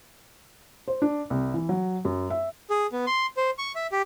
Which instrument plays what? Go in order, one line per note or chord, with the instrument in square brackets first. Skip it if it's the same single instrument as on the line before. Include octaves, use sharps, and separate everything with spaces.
[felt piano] C5
D4
C2
E3
F#3
F#2
E5
[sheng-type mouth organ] G#4
B3
C6
C5
C#6
E5
G4